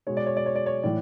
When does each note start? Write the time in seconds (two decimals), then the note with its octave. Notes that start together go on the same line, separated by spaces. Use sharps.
0.07 B2 G#3 C#5
0.17 D5
0.26 C#5
0.37 D5
0.46 C#5
0.56 D5
0.66 C#5
0.83 A2 E3 D5